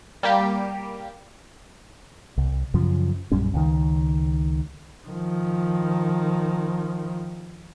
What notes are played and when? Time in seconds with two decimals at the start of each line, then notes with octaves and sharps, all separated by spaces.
0.23 G3 A#3 G4
2.38 C2
2.74 F#2 C#3 F3
3.32 A#1 F#2 G3 C#4
3.54 C#2 D#3
5.08 D#3 F3